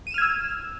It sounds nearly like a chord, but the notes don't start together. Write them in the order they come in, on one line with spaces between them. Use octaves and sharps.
D#7 E7 F6 G#6 E6